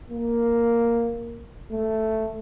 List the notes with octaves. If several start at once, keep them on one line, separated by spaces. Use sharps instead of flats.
A#3
A3